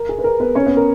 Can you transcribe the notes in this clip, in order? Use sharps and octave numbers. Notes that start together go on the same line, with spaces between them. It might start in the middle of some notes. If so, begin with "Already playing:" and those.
Already playing: A#4
G#4
B4
A#4
B3 B4
C#4 C#5
B3 B4
A#4